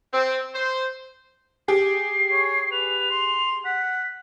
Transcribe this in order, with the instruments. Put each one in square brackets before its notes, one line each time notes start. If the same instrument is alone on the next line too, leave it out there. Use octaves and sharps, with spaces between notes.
[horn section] C4
C5
[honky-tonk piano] G4 G#4 [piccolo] C7
[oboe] C#5
[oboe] B4 [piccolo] F7
[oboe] C6
[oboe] F#5 [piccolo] B6